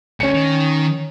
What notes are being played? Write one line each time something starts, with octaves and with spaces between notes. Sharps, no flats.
D2 C#4 C#7
D#3